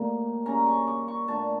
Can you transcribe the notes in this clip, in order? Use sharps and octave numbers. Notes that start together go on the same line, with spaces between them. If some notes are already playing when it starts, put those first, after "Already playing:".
Already playing: A2 G3 A#3
C#3 G3 C#4 A#5
C#6
D6
C#6
A#2 A3 D4 A5